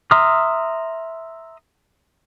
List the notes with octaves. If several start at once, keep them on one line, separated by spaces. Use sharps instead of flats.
E5 A#5 C6 D#6 F6